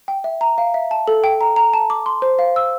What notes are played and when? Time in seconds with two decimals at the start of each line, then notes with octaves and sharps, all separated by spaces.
0.08 G5
0.24 E5
0.41 A#5
0.58 F5
0.74 E5
0.91 A5
1.08 A4
1.24 G5
1.41 A#5
1.56 A#5
1.73 A5
1.90 D6
2.06 C6
2.22 C5
2.39 F5
2.56 E6